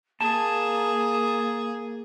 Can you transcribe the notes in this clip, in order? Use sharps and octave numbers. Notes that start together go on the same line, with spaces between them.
A#3 G#4 A5